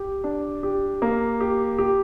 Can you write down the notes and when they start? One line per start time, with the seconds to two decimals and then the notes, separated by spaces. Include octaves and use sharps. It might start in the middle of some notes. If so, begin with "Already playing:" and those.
Already playing: G4
0.24 D4
0.63 G4
1.02 A#3
1.40 G4
1.78 G4